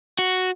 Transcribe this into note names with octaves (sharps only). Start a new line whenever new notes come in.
F#4